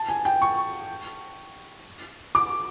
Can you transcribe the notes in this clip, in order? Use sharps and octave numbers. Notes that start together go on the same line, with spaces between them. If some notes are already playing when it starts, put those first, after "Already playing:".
Already playing: A5
G#5
G5
C#6
D6